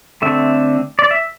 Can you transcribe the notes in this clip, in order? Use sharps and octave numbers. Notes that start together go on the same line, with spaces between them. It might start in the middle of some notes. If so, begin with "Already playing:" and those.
D3 A3 C4 E5
D5
E5